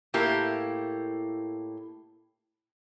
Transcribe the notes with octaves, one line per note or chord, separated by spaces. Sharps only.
A2 A#3 E4 G4